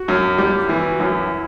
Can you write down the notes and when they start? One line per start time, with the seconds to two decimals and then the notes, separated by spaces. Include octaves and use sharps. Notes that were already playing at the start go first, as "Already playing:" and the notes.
Already playing: F#4
0.08 F#2
0.38 G3 E4
0.59 E4
0.69 E3
0.80 F#4
1.00 F#2 E4